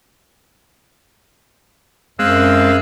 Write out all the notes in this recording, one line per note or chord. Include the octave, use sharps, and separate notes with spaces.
F#2 G#3 C4 F5 E6 F#6